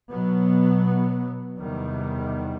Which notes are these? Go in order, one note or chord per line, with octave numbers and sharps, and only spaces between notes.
B2 F#3 B3
E2 C3 D#3 G3 B3